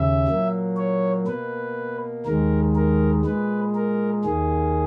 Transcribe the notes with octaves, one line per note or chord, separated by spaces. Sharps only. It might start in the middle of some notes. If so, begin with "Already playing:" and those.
Already playing: D#2 C#3 E5
A#2 F#3 A#3
C#5
B2 A#3 B4
D#2 D#3 G#3 A#4
A#4
A#2 G#3 B4
A#4
D#2 D#3 A#3 G#4